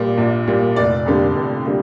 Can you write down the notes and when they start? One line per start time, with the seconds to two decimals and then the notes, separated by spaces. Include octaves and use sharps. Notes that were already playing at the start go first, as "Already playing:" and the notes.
Already playing: A#1 A#2 G3
0.17 A#1
0.47 A#2 G3
0.76 F1 D5
1.06 F2 D3 G3 A#3
1.36 F1
1.65 D3 G3 A#3